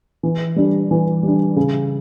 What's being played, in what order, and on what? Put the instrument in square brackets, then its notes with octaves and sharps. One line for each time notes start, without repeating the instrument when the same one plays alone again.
[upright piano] E3
G3 D4
E3
G3 D4
C#3